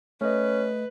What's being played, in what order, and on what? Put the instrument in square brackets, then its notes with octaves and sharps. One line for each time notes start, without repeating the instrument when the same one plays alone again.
[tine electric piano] A3 D#5 [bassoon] C#4 [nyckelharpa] B4